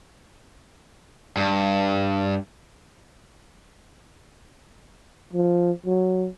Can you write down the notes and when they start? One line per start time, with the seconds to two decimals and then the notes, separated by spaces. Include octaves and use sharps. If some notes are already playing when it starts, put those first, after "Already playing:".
1.37 G2
5.33 F3
5.86 F#3